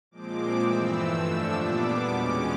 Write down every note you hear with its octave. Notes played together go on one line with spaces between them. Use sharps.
A#2 F3 G#3 C4 D6
G2 E3 A3 C4 E6
F2 D3 F3 A3 D4
A#2 G3 B3 D4 D6
E2 B2 G#3 C#4 D6